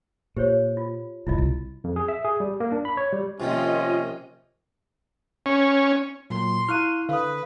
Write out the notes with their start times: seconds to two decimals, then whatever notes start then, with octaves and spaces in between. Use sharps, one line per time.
0.37 A#2 G4 C5 C#5
0.77 F4
1.27 F#1 C2 E4 F4 D#5
1.38 C2
1.84 F2
1.96 G#4
2.08 E5
2.24 G#4
2.40 G3
2.60 A#3
2.72 D4
2.85 B5
2.97 C#5
3.12 G3
3.40 C3 D#3 F3 A#3 C#4 F4 D#5
5.46 C#4
6.30 A#2 F#3 A#3 C6
6.69 E4 F5 C#6 F6 F#6 D#7
7.09 D3 B4 F5 D#6